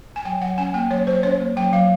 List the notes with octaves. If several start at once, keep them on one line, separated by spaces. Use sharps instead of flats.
G#5
F#3 G5
F#3 F#5
C#4 G#5
A#3 G5
F#3 C#5
F#3 C5
C#4 C#5
A#3
F#3 G5
F#3 F5